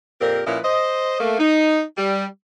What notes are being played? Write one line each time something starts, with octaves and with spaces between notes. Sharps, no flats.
F2 A#2 C4 G4 A#4
A#2 F3 C#4 E4 B4 D#5
C5 D#5
A3 A#3
D#4
G3